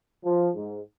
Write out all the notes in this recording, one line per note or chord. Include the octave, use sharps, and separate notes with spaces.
F3
G#2